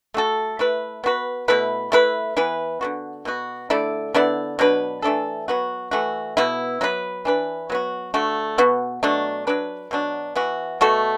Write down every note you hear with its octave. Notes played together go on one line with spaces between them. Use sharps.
A3 F#4 A4
A3 E4 B4
B3 F#4 B4
B2 A3 E4 B4
A3 E4 B4
E3 B3 E4 B4
D3 B3 F#4
B2 B3 F#4
D3 A3 E4 D5
D3 B3 E4 D5
B2 F#3 D4 B4
E3 A3 D4 A4
F#3 B3 F#4
E3 A3 F#4
B2 B3 E4
F#3 B3 E4 B4
E3 D4 B4
F#3 B3 F#4
D3 A3 F#4
B2 B3 F#4
B2 F#3 A3 D4
F#3 D4 B4
B2 F#3 D4
E3 B3 F#4
B2 A3 F#4 A4